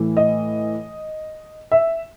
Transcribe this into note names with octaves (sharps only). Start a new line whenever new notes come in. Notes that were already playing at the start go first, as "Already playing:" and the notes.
Already playing: A2 E3
D#5
E5